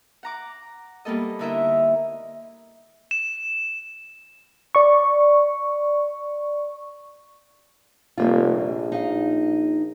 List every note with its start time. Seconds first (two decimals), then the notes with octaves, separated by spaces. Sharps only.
0.23 F#5 A#5 D6
1.05 G3 A#3 B3 A4 D#5
1.39 D3 D#4 E4 A#4 D#5 E5
3.11 E7
4.75 D5 C#6
8.18 F1 G3 A#3 F4
8.55 A#1
8.92 D#4 F5